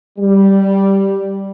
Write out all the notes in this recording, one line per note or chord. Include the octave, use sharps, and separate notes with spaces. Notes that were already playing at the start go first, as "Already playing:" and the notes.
G3